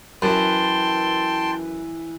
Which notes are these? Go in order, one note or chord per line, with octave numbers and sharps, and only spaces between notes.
F#2 E3 B4 G5 A5 C6